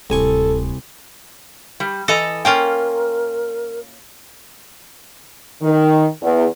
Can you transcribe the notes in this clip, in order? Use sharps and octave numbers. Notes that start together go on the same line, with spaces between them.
D1 C2 A4 G#5 C#6
G3
E3 A4 D#5 A5 A#5
A#3 C#4 F4 A#4 G5
D#3
E2